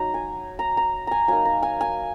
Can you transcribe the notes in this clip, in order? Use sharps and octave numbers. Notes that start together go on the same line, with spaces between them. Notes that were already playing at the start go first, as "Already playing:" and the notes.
Already playing: F#3 D#4 A#5
G#5
A#5
A#5
G#5 A#5
F#3 A#3 D#4 G#5
A#5
G#5
G#5